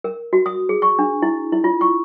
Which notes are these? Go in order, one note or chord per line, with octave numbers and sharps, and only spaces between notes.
A#4
F#4
D#6
G#4
C#6
D4
E4
E4
F4
C#6